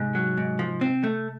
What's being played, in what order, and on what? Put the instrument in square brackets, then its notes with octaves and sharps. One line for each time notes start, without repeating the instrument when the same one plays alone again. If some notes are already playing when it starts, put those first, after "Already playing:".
Already playing: [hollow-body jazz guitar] G#2 [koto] C3
[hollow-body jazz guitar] F#3
G#2
F3
C4
A3